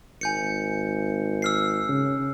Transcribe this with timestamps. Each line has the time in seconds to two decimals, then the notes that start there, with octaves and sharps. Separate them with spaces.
0.21 G#1 G#5 G6 C#7
1.42 E6 F6 C7
1.89 C#3